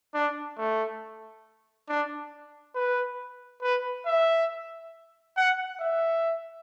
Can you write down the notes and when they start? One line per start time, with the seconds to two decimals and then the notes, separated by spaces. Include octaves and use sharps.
0.14 D4
0.58 A3
1.89 D4
2.75 B4
3.62 B4
4.06 E5
5.37 F#5
5.80 E5